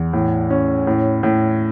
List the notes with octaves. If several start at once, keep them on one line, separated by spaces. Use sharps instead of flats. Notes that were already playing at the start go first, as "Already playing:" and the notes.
Already playing: E2
A2
C#4
A2
A2